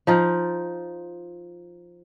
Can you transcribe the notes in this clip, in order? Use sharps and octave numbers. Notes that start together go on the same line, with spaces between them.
F3 D#4 F4